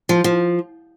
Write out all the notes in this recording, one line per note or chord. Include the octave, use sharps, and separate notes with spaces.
F3
F3